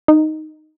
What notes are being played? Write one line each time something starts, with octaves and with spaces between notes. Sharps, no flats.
D#4